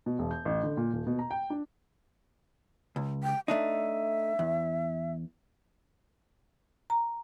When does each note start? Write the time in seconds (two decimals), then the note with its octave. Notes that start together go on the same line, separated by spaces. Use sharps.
0.06 B2
0.19 E1
0.31 G6
0.45 A1
0.63 D3
0.77 A#2
0.93 D#1
1.07 B2
1.19 A#5
1.31 G5
1.50 D4
2.96 C#2
3.23 G5
3.48 A3 D4 D#4 E5
4.39 E2
6.90 A#5